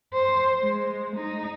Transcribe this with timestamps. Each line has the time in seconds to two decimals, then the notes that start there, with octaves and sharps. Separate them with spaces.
0.13 C5
0.62 G#3
1.16 D#4